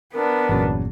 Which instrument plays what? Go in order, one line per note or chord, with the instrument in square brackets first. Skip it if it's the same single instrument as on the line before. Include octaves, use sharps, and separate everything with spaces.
[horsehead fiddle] B3 D4 [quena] A#4
[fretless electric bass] G1 A#2 [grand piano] E2 F#3 C#4